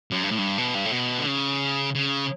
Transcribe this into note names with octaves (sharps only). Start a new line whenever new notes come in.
F#2
G2
A2
G2
B2
G2
A2
B2
D3
C#3
C#3